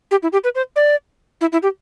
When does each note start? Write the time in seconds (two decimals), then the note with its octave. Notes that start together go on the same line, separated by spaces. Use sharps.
0.11 G4
0.23 E4
0.33 G4
0.44 B4
0.55 C5
0.76 D5
1.41 E4
1.52 E4
1.63 G4